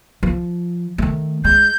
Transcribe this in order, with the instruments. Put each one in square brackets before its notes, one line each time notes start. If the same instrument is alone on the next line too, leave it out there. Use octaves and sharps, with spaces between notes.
[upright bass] F3
D#3 A3
[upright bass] G#3 [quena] G6